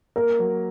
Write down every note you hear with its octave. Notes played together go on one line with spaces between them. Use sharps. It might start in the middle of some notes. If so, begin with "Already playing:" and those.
A#3 A#4
F#3